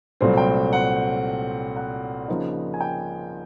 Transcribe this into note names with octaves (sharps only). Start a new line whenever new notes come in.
C2 A#2 F#3 A3 C4
G5
F#5
F#5
C#3 F3 A#3 D#4
G#5
G5